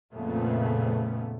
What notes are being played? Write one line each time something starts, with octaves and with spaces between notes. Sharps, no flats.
F2 A#2 C#3 A3 B3